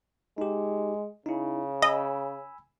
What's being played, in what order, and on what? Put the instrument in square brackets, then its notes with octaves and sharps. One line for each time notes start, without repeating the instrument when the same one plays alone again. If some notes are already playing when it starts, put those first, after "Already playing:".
[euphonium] G#3 [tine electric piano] D#4 G4
[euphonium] C#3 [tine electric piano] D#4 E4
[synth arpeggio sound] D#5 [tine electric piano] G#5 B5 E6